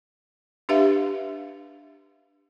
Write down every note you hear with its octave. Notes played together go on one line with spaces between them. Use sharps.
D4 G4 B4 E5 F5